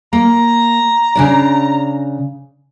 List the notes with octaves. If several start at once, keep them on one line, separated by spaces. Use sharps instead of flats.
A#3 A#5
C#3 D4 D5